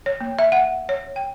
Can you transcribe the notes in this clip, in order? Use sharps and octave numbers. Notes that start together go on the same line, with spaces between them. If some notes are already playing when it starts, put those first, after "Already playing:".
C#5
A#3
E5
F#5
C#5
G5